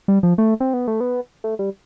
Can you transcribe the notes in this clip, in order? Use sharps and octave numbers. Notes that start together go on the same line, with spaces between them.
G3
F3
A3
C4
B3
A3
B3
A3
G3